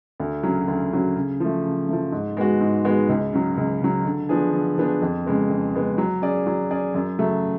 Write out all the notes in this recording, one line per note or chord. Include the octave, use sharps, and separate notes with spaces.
D2
C#3 F#3 C#4
D2
C#3 F#3 C#4
C#3
F3 A3
C#3
F3 A3
G#2
G#3 B3 F#4
G#2
G#3 B3 F#4
C#2
C#3 F#3
C#2
C#3 F#3
D3
F3 B3 D4 G#4
D3
F3 B3 D4 G#4
F2
C#3 G#3 B3
F2
C#3 G#3 B3
F#3
C#4 G#4 D5
F#3
C#4 G#4 D5
F#2
C#3 F#3 A3